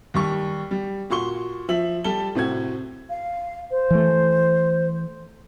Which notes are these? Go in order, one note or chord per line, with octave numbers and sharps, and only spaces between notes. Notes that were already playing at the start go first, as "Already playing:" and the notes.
D#2 G3 C#6
G3
A#2 F#4 C6 C#6 G7
F3 E5 F#7
G3 A4 A5 G7
A2 C3 C4 F#4 G#6
F5
C5
E3 A3